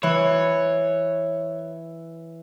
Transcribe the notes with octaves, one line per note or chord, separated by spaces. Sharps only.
E3 C#5